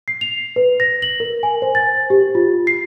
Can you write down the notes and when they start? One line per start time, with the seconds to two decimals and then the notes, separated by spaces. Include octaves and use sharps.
0.08 C7
0.21 F7
0.56 B4
0.80 A#6
1.02 F#7
1.20 A#4
1.43 G#5
1.62 C5
1.75 A6
2.10 G4
2.35 F4
2.67 C7